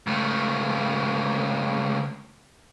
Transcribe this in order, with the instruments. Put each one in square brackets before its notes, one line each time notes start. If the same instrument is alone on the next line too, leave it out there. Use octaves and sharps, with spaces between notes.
[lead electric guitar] C#2 A3